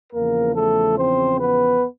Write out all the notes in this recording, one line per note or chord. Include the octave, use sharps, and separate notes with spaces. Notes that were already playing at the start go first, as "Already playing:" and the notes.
E2 C#3 F3 A#3 A#4
A3 A4
C4 C5
B3 B4